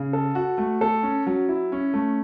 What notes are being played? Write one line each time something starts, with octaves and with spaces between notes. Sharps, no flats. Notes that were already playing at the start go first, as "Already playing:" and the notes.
Already playing: C#3
A4
F#4
A3
A4
C#4
F#3
E4
C#4
A3